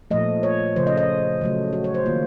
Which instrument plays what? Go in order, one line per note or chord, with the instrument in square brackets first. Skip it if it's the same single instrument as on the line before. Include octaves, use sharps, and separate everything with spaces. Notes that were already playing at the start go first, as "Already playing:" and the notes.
[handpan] A#2 F3 A3 D#5
C#5
C#3 F3 A3 C5
D#5
D#5
C#3 F#3 A3
F#4
C#5
C5
D#3 A#3 F4